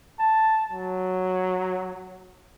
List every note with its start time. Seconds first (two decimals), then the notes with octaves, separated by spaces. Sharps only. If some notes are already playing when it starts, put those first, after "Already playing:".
0.19 A5
0.71 F#3